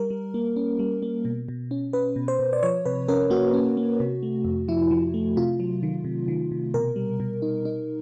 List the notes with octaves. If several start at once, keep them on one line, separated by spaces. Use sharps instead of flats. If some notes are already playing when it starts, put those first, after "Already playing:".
Already playing: G3 A#4
G3
A#3
C#4
G3
A#3
B2
B2
C#4
C#4 B4
B2
C5
B2
D5
F3 C#5
C3 B4
C#4 A#4
A#3 F#4
C#4
A#3
C3
A3
F2
F3 E4
F3
A3
C3 F4
F#3
D#3
C3
D#3
C3
B2 A#4
G3
B2
D#4
D#4